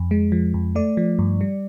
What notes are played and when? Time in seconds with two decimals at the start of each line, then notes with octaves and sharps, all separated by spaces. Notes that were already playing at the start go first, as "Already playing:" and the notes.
Already playing: F2
0.11 G#3
0.32 F3
0.54 F2
0.75 A3 D5
0.97 F3
1.19 G2
1.41 G3